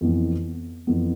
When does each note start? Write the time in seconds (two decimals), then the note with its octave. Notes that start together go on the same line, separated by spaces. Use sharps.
0.01 F2 E3 B3
0.87 F2 E3 B3